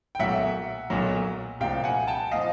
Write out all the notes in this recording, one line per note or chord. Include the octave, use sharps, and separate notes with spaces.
G5
B1 A#2 F#3 E5 F#5
B1 A#2 F#3
C2 A#2 F3 F5 G5
F#5 G#5
G5 A5
A#2 F3 D#5 F5